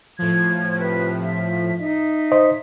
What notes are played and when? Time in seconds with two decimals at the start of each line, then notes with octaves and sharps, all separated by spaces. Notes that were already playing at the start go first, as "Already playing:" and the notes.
0.19 A2 F3 G#6
0.79 C3 B4
1.20 E5
1.81 D#4 E5
2.32 C5 D#5